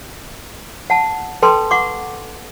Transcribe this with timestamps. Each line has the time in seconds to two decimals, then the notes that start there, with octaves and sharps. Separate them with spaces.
0.90 F#5 A5
1.42 A4 B4 G5 A5 C6
1.71 F#5 C#6 D6